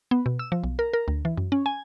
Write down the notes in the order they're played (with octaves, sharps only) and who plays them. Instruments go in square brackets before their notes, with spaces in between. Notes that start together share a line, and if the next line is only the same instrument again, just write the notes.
[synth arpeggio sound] B3
B2
E6
F3
B1
A#4
A#4
D2
E3
F#2
C#4
G#5